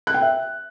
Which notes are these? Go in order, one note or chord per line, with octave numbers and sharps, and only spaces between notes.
F#6
G5
E5